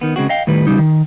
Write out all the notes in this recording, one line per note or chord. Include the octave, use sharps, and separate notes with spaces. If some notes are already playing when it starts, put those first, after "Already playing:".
D#3 B3
C#3 G#3 C4 F#4
D#5 F5 G5
A2 D#3 G3 B4
C#3 G3 D#4
D#3